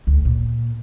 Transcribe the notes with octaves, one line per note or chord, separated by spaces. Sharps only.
D2
A#2